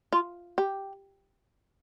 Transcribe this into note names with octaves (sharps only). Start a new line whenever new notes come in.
F4
G4